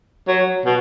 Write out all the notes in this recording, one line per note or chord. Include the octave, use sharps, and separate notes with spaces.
F#3
B2